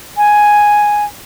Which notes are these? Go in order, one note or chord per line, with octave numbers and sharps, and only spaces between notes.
G#5